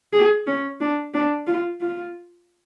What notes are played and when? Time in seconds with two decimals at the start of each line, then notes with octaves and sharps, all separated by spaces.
0.13 G#4
0.47 C#4
0.81 D4
1.14 D4
1.47 F4
1.81 F4